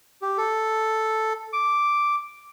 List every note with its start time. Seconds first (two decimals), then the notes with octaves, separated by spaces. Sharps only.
0.22 G4
0.38 A4
1.53 D6